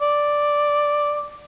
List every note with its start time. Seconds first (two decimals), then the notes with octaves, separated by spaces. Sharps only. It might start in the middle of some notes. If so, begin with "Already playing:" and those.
0.02 D5